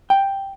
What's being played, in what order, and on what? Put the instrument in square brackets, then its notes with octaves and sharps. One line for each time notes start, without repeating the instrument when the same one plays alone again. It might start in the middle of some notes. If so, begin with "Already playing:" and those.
[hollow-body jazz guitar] G5